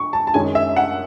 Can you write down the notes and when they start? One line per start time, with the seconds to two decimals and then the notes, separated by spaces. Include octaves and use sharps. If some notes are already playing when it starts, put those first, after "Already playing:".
Already playing: C#6
0.13 A5
0.27 A5
0.34 F#2 D#3 G#3 C#4 G#5
0.55 E5
0.76 F#5